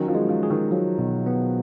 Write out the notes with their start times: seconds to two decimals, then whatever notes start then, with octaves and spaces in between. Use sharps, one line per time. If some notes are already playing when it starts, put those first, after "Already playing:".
Already playing: D#3 F#3 C#4
0.08 F3
0.15 G#3
0.29 F3
0.43 G#4
0.50 D#3
0.71 F3 F#3
0.98 B2
1.26 B3